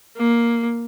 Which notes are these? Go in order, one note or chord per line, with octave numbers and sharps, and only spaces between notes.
A#3